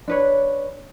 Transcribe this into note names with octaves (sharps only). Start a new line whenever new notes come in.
D4 B4 C#5